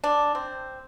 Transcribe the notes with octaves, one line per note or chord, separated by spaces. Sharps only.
D4
C4